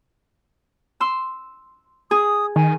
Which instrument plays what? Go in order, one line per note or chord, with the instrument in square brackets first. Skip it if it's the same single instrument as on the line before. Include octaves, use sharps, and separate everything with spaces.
[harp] C6 E6
[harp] G#4 [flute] D#6
[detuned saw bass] D#3 [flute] G#5